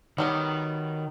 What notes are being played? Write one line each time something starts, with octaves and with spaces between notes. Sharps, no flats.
D#3 F#3 G3 B3